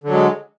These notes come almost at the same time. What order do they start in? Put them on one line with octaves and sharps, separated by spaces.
D3 F#3 G#3